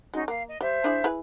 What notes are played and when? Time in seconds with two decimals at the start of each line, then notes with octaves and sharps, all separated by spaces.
0.14 G#3 C#4 D#4 F#4
0.28 A#3 F5
0.48 D#5
0.61 G3 C5 E5
0.84 D4 E4 G#4
1.04 E4 G#4 B4